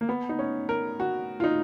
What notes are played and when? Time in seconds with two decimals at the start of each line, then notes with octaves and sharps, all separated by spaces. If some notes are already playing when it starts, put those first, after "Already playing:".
0.01 A#3
0.09 B3
0.29 D#4
0.39 C#4
0.69 A#4
1.00 F#4
1.40 F4
1.44 D#4